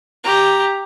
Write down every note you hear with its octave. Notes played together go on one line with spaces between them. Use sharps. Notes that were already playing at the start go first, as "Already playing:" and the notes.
G4 A#5